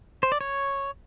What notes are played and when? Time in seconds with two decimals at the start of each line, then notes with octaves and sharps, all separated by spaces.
0.23 C5
0.32 D5
0.41 C#5